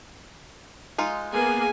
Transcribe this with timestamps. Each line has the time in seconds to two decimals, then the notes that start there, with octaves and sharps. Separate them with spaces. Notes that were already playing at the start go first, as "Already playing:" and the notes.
0.98 G#3 D#4 F4
1.33 A#3 B3 G#4 G#5